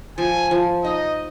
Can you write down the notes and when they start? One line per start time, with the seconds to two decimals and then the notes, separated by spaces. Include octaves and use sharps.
0.18 F3 G#5
0.51 F3
0.84 D#4 D#5